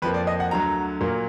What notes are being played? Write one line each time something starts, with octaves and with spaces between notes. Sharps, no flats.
F2 F3 A#3 B4
D5
D#5
F#5
D2 D3 F#3 A#5
A#2 F#3 A#3